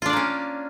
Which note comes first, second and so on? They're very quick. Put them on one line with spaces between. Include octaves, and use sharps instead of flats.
F4 D4 D5 A#3 C#4